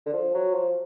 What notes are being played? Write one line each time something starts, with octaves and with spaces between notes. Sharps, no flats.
D3
F3
F#3
F3